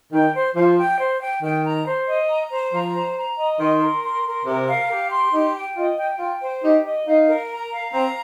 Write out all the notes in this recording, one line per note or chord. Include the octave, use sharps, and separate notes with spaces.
D#3 G5
C5
F3 C5
G5
C5
G5
D#3 G5
A#5
C5
D#5
A#5
C5
F3 A#5
C5
A#5
D#5
D#3 C6
A#4
C6
A#4
C3 A#4
F5
G4
C6
D#4 G4
G5
F4 D#5
G5
F4 G5
C5
D#4 G4
D#5
D#4 F5
A#4
A#5
F5
C4 A#5